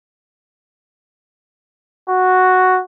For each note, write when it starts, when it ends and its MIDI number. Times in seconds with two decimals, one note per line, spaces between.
2.10 2.80 66